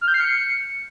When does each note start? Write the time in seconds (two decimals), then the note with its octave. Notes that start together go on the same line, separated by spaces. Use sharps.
0.01 F6
0.08 G6
0.14 C7
0.21 C#7